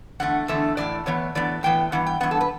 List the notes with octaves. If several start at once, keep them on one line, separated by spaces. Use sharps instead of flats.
E2 D3 A3 F#5
E2 D3 A3 E5
A2 E3 B3 D5
A2 E3 B3 C#5
A2 E3 B3 D5
A2 E3 B3 G5
G2 E3 B3 F#5
G5
G2 E3 B3 F#5
A4
B4